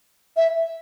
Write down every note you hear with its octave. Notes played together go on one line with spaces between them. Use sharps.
E5